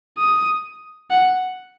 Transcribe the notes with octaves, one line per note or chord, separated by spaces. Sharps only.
D#6
F#5